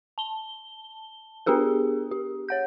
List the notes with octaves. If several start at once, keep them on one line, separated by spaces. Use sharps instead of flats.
A5 G7
B3 D4 G4 G#4 A#4
G4
C#5 F#5 G6